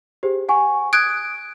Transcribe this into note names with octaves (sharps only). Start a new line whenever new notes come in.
G4 G#4 C5
F#5 G#5 C#6
D#6 F#6 G#6 D7